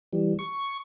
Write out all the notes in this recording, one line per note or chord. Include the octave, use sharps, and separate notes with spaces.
E3 G3
C#6